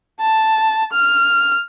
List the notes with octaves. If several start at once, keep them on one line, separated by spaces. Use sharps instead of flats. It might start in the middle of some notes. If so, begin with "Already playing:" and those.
A5
F6